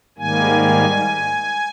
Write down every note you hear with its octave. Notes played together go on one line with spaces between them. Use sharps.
G#2 D#3 G3 A#3 G#5